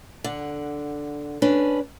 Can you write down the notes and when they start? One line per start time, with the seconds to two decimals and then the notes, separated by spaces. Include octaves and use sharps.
0.24 D3 F#5
1.42 C#4 D4 B4